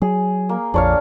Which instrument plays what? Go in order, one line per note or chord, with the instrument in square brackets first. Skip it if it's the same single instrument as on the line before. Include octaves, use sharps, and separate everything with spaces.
[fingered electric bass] F#3 [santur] G#4
[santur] A#3
[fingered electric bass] A#1 F2 [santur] D4 C#5 F5